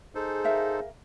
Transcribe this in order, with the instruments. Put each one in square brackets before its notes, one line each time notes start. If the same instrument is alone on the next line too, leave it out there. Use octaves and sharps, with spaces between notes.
[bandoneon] D#4 A4 C5 [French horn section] G#4
[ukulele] A#4 E5 F5